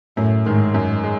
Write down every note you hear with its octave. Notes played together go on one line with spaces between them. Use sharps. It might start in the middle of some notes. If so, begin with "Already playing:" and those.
F#2 A2
G#2 D#3 G#3
F#2
G#3